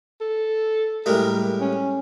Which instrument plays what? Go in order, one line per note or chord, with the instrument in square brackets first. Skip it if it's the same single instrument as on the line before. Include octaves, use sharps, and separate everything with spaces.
[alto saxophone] A4
[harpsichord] A2 G3 G#3 [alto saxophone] A#4
[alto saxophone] C#4